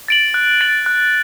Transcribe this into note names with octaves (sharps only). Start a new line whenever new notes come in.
A6 D7 F#7
F#6
A6 D7 F#7
F#6